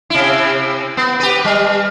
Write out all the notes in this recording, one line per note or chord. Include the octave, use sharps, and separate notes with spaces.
C3 E4
B3
G4 B4
G3